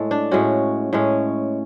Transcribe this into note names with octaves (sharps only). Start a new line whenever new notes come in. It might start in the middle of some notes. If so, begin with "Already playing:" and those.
Already playing: A2 G#3 A4
D4
A2 G#3 C#4 F#4
A2 G#3 C#4